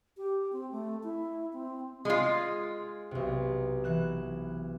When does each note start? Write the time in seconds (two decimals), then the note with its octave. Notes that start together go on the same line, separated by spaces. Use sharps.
0.17 G4
0.53 C4
0.71 A3
1.03 E4
1.53 C4
2.05 G#3 F4
3.11 B1 C3
3.84 E3 F#6 E7